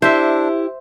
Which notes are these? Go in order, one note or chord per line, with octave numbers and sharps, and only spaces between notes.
D4 E4 G4 C5 E5